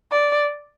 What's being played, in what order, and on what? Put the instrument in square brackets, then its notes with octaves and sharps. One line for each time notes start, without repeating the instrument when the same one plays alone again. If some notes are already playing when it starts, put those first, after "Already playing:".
[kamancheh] D5